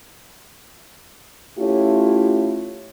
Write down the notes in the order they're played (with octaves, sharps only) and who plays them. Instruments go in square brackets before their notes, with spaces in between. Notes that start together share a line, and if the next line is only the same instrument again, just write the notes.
[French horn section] A3 C#4 E4 F4 G4